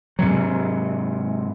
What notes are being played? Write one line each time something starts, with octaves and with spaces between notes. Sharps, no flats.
G#2 C3 F#3